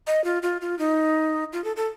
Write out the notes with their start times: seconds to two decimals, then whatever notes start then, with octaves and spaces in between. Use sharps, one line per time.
0.07 D#5
0.24 F4
0.42 F4
0.61 F4
0.79 D#4
1.53 F4
1.64 A4
1.76 A4